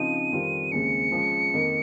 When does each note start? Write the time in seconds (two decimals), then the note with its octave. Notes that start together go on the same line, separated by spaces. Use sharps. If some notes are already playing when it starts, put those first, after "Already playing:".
Already playing: C#3 F3 C4 D#4 D#7
0.31 F2 D#3 G3 C4 F4
0.72 D#2 C#3 G#3 C4 C#7
1.12 F3 G#3 C#4
1.53 F2 D#3 A#3 D#4